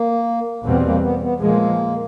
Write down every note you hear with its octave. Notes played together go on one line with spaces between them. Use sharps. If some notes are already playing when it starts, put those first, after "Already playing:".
Already playing: A#3
E2 B2 G3 B3 C4
A#3
B3
B3
A#2 F3 G#3 A#3